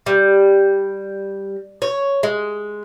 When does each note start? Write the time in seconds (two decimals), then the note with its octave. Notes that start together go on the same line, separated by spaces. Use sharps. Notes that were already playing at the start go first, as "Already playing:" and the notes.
0.06 G3
1.82 C#5
2.23 G#3